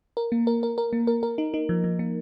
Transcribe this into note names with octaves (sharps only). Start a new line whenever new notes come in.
A#4
A#3
A#4
A#4
A#4
A#3
A#4
A#4
D#4
D#4
F3
F3
A#3